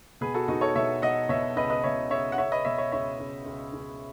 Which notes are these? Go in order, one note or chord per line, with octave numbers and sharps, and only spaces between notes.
B2 G#4 B4
F#4 A4
B2 D#4 F#4
A4 C#5
B2 C#5 E5
B2 D#5 F#5
B2 C#5 E5
C#2 B4 D#5
B4 D#5
B2 C#5 E5
C#2 C#5 E5
F#5
C#2 C#5 E5
B4 D#5
B2 C#5 E5
C#5 E5
C#2 C#5 E5
C#2
C#2
C#2